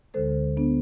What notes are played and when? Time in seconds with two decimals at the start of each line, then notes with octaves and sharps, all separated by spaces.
0.14 D2 D3 G#3 A4 C5
0.57 B3 D4